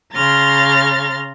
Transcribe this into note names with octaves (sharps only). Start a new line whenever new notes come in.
C#3 A#5 C6 F6 A6